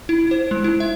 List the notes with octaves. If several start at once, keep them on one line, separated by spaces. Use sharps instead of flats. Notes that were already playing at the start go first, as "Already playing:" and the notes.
E4
C5
G#3
E4
E5